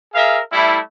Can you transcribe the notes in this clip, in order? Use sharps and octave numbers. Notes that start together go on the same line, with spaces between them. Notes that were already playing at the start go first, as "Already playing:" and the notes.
G#4 A#4 E5 F5
G3 A3 E4